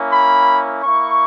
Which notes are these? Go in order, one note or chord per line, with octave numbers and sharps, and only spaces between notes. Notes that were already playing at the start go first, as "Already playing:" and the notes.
Already playing: A#3 C#4 E4
B5
A#3 E4 C#6